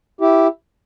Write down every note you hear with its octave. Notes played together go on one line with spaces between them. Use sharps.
E4 G4